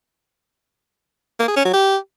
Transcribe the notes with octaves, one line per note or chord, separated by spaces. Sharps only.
A#3
G#4
C#4
F#3
G4